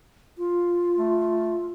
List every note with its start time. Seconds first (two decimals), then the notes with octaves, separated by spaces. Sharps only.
0.38 F4
0.98 A3